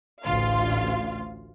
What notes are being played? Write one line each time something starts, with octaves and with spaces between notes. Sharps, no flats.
A1 D2 F4 F5